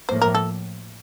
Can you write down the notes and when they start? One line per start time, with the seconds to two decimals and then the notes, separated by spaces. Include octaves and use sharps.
0.09 A2 F3 A#3 C5
0.22 A#4
0.35 A4